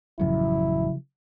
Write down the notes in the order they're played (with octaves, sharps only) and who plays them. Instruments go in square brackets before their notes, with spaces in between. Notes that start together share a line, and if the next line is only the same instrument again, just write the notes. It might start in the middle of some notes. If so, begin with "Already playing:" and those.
[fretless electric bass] A1 F#2 [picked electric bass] C#3 F3 F#3 [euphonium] E4